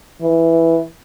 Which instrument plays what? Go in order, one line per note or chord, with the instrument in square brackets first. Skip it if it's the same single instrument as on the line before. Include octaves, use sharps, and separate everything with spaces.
[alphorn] E3